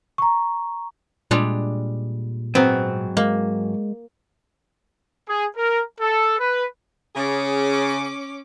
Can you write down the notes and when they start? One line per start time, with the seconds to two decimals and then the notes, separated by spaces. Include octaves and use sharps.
0.18 A#5 C#6
1.31 A#2 G3 G#3 D4
2.55 G#2 F#3 B3 C4
3.17 G#3 A#3
5.29 G#4
5.57 A#4
6.01 A4
6.40 B4
7.15 C#3 C#4 G#4 D6